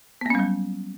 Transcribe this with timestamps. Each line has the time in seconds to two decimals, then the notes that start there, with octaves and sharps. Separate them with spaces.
0.21 B3
0.26 A#3
0.30 C#4
0.35 G3
0.39 F#3